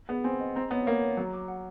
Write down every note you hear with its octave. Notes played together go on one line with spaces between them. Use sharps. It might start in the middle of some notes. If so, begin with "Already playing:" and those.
B3 G#4
C4 G#5
D#5
C4 A#5
B3 C#5
A#3 C#5
C#5
F#3 A#5
D6
F#5